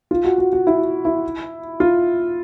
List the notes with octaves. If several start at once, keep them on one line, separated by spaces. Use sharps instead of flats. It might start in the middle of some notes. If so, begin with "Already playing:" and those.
F4
F#4
F#4
F#4
E4
E4
F4